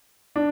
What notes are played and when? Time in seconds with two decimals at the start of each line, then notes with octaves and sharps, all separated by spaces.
0.36 D4